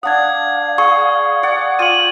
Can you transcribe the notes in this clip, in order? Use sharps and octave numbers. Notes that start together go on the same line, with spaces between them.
D4 F5 F#5 D#6 G#6
G#4 C#6
D5 F#5
F4 G5 G#5 D#7 F#7